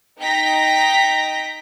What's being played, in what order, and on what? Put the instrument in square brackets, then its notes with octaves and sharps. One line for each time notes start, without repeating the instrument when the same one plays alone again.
[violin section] D#4 G5 A#5 A#6 B6